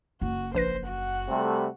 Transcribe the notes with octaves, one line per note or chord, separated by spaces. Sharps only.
F#1 F#4
A#1 B4 C5 A#6
F#4 F#5
C3 G3 A3